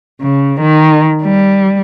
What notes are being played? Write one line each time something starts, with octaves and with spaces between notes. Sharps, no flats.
C#3
D#3
G3